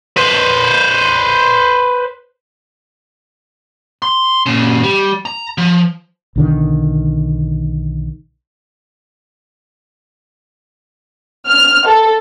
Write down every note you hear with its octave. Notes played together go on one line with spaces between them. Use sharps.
B4 C5
C6
A#2 C#3
G3
A#5
F3
B1 D3 D#3
F6
A4